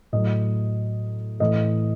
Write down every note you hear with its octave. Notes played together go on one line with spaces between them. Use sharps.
A2 F#3 A3 D#5
A2 E3 A3 D#5